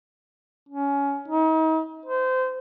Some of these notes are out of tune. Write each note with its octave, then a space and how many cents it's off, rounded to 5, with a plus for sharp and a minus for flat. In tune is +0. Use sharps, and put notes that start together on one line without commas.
C#4 +20
D#4 +40
C5 -25